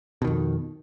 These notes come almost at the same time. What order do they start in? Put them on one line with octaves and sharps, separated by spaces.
B2 D#3 F2